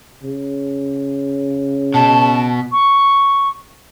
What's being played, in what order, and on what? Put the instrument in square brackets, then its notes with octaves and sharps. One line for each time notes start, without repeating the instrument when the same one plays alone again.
[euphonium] C#3
[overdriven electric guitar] B2 [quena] A5
[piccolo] C#6